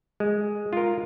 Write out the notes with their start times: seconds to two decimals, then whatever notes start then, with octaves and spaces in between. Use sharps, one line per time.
0.20 G#3
0.73 F4 A#4